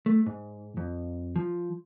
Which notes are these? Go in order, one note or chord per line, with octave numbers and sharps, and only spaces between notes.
A3
G#2
F2
F3